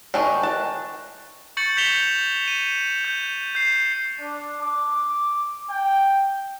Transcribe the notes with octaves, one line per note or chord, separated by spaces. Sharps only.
D#3 D4 D#4 G#5 A5 C#6
A5 F#6
C#6 G6 A6 C#7 F#7
G6 B6 E7 F7 G7
D#7
G6
G6 C7
D4
D6
G5